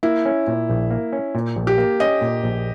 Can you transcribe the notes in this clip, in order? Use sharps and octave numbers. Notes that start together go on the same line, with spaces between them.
A#3 E4
C#4
A#2
A#1
A#3
C#4
A#2
A#1
G4
A#3
C#4 D#5
A#2
A#1